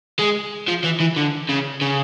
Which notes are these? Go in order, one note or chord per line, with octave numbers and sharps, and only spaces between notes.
G#3
F3
E3
E3
D3
C#3
C#3